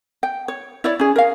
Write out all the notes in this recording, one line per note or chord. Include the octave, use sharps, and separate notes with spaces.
G5
C#5
E4 C#5 D5
C#4 G#4
A#4 F5